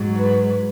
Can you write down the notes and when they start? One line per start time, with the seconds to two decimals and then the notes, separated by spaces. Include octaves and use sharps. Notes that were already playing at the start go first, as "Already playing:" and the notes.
Already playing: G#2 F#3
0.16 B4